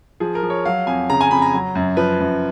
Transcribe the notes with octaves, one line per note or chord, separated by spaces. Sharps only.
F3 G#4
A#4
F3
C#5
F#3 F5
F2 G#5
C#3 A#5
G#5
F2 B5
A#5
F#3
F#2
F3 B4
F#2